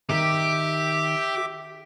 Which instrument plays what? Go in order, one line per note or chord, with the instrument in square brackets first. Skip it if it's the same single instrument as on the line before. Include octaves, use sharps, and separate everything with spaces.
[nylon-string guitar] D#3 [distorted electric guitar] G4 [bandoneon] E5 D6